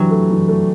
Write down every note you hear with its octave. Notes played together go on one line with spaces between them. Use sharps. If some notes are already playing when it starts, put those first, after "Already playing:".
Already playing: E3 F#3 D4 G4
A3
E3
A3